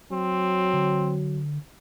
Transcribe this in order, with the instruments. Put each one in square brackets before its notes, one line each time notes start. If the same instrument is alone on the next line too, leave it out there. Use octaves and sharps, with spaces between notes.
[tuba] F#3 [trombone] C4
[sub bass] D3